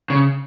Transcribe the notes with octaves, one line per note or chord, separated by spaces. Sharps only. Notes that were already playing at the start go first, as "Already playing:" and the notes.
C#3